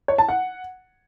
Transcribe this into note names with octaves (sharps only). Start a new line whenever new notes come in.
C#5
A5
F#5